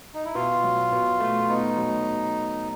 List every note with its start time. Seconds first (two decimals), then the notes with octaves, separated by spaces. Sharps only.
0.14 D#4
0.25 E4
0.35 B2 F4
0.64 F#3
0.92 B2
1.20 A3
1.49 B3 D#4
1.77 F#3